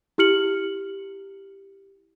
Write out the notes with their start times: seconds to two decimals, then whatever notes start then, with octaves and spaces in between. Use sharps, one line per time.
0.18 E4 G4 F6 C#7 F#7